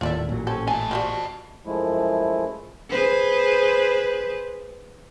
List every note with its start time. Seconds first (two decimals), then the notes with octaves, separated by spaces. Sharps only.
0.01 D#1 D#2 A2 A3 F4 D5 E5
0.29 A1 A#2 F#3
0.47 C4 C#4 A4
0.68 A3 D#5 G#5 A5
0.91 D#3 F3 G3 F#4
1.66 F#2 F3 G#3 A3 E4
2.90 G#4 B4 C5